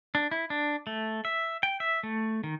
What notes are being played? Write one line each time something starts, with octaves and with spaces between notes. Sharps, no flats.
D4
E4
D4
A3
E5
G5
E5
A3
D#3